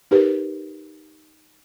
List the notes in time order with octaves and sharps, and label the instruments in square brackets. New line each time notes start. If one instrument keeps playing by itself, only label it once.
[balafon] D#4 G4 A#4 B4